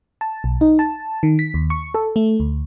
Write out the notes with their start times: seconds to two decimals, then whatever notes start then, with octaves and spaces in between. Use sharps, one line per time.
0.21 A5
0.44 B1
0.61 D#4
0.79 A5
1.23 D#3
1.39 B6
1.54 D#2
1.70 C#6
1.94 A4
2.16 A3
2.40 D2